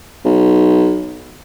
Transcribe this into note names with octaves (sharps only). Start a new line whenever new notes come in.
B1